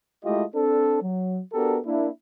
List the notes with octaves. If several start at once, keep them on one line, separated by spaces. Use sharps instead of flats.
G#3 A3 E4 F4 G4 D#5
C4 D4 A4
F#3
B3 D4 F#4 G4 A4 A#4
A#3 D4 E4